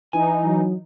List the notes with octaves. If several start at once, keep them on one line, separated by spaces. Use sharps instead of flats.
E3 D#4 G#5
F#3